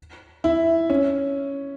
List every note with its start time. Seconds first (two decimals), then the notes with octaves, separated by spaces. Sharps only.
0.44 E4
0.90 C#4